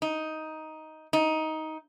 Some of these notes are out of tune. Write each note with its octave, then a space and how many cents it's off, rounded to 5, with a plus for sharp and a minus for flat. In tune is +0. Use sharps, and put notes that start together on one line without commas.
D#4 +10
D#4 +15